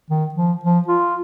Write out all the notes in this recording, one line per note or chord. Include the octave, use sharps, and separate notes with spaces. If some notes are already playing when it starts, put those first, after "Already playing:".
D#3
F3
F3
F4